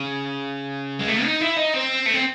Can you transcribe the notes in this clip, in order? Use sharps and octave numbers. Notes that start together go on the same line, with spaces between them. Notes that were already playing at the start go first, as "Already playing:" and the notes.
Already playing: C#3
G#3
A3
D#4
E4
D#4
C4
A3
C4